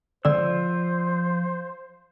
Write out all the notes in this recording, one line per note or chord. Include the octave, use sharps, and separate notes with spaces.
D3 F3 G#3 C4 C5 D5 E6